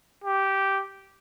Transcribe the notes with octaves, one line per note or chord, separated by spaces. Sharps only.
G4